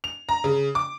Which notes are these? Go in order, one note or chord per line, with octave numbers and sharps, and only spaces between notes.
F7
A#5
C#3
D6